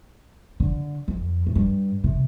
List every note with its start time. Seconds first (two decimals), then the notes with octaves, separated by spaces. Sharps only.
0.60 D3
1.08 F2
1.46 A2
1.55 G2
2.04 C3